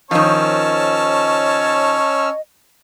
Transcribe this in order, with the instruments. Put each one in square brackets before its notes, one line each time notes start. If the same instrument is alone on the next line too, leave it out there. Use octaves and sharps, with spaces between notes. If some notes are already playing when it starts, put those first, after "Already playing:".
[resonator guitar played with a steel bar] D#3 F3 [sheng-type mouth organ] C#4 E6 F6 [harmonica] C#5 A5 [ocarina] D#5